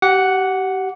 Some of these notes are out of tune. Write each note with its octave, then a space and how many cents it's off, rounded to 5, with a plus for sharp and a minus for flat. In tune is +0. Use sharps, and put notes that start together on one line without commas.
G4 -30 F#5 +0